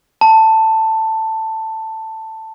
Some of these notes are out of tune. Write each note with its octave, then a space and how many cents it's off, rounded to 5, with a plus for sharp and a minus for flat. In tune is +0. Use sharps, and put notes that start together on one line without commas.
A5 +10